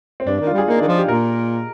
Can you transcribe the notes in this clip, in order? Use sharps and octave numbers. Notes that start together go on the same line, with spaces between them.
C4
G2 D4
D4
D#3
F4
G3
G#4
A#3 D#4
D4
D#3
F3 F4
G4
A#2 A#4